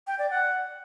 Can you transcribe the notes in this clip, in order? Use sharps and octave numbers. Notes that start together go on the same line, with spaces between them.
G5
D5
F#5